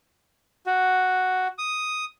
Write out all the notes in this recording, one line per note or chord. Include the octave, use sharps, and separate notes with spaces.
F#4
D#6